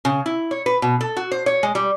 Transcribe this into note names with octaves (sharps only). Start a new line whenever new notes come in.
C#3
E4
C#5
B4
B2
A4
F#4
C5
C#5
G#3
G3